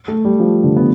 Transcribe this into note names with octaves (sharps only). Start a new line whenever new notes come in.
A3
G3
F3
D3
B3